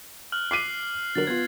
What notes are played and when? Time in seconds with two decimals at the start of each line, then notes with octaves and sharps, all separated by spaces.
0.32 F6 F#6 F#7
0.51 D6 B6 C7 D#7
1.15 D3 F#3 A#4 A6 F#7
1.27 B3 F4 G#6